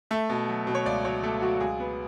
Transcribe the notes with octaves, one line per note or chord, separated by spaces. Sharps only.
A3 E5
B2
F#3
B2
C#5
C#2 D5
F#3 C#5
A3 A4
F#3 F#4
C#2 G#4
B3